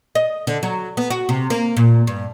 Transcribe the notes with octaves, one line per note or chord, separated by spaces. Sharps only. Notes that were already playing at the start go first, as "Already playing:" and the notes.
D#5
D3
F#3
B3
F#4
C3
A#3
A#2
G2